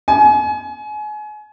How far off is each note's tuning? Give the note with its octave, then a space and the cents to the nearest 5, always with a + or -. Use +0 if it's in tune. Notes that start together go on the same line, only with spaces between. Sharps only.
G#5 +30